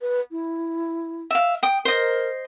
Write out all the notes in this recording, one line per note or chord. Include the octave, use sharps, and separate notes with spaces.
B4
E4
E5 F5
G5 D#6
A#4 C5 D#5